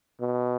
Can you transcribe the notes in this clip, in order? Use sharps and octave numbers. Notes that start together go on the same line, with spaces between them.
B2